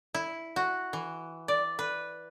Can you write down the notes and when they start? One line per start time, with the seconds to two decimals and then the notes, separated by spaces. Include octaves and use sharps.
0.15 E4
0.56 F#4
0.93 E3
1.48 D5
1.79 B4